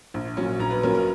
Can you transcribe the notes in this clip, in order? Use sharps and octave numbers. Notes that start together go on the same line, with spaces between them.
A#1
A#2 F#3 C#4
A#1 A#5
B4
A#2 F#3 C#4 A#4
A#4